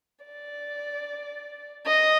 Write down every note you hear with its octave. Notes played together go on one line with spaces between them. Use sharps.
D5
D#5